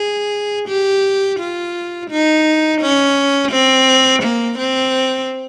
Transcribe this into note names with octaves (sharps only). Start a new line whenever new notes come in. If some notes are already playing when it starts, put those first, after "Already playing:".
Already playing: G#4
G4
F4
D#4
C#4
C4
A#3
C4